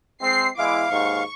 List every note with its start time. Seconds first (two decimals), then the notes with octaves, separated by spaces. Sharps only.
0.22 G#3 C4 C7
0.58 E2 G#3 E4 F5 D6
0.91 D#2 G#2 C#6